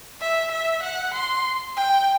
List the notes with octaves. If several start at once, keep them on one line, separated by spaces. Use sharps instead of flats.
E5
E5
F#5
C6
G5